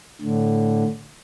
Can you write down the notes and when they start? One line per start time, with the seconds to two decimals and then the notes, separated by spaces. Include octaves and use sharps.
0.21 A2 D3